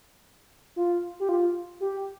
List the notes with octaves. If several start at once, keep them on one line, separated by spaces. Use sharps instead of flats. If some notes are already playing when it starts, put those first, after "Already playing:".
F4
G4
F4
G4